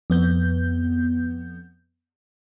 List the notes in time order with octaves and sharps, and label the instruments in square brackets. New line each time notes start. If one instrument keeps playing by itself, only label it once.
[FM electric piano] F2 B3 G6